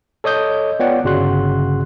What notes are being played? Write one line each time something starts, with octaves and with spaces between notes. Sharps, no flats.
A4 C#5 D#5 D#6 G6
B3 F4 C#5 D5 F#5 G5
G1 C#3 F#4 C6 F#6